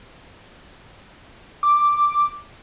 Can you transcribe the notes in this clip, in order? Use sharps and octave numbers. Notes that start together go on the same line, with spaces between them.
D6